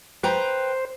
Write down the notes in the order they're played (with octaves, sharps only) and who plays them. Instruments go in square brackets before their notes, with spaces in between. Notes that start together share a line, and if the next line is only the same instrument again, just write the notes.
[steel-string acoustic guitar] B4 G5 A#5 [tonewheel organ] C5